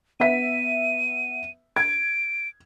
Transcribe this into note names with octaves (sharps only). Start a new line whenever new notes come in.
B3 E5 B6 D#7
G#6 D7